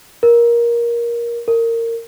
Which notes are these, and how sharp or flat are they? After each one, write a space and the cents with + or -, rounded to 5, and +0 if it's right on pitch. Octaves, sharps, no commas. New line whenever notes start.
A#4 +15
A#4 -20